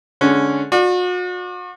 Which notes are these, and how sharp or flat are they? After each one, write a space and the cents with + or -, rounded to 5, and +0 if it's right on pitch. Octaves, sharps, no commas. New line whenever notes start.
D3 -5 G#3 +15 C#4 -5
F#4 -40 D5 +20